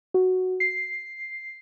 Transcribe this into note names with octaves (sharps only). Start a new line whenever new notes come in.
F#4
C7